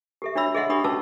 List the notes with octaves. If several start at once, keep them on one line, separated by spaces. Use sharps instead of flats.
G4 A4 E5
D4 F#4 C#5 E5 B5 E6
G#4 A4 D#5 E5 F#5 C6
D4 G4 B5 C#6 D#6
C#4 F#4 B4 A5 D6 E6